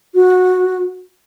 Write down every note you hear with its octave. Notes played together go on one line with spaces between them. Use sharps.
F#4